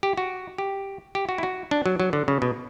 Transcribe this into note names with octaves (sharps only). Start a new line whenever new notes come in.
G4
F#4
G4
G4
F#4
E4
F#4
D4
F#3
F#3
D3
C#3
B2